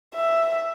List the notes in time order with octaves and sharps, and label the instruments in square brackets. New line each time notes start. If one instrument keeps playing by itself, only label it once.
[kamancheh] E5